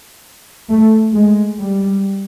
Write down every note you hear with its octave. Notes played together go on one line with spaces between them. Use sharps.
A3
G#3
G3